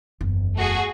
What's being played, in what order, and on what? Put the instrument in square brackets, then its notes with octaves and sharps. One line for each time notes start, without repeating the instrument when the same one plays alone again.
[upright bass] F#1 E2
[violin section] A3 F#4 G#4